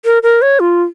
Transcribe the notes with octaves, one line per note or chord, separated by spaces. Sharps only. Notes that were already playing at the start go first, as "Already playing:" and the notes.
A#4
A#4
C#5
F4